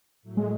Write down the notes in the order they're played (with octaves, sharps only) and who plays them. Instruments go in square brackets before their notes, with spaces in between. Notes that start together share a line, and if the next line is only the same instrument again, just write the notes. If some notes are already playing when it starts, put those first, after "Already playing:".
[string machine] A2 F#3 A3
[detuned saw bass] G#3